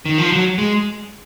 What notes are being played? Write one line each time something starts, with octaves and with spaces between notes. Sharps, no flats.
D#3
F3
F#3
G#3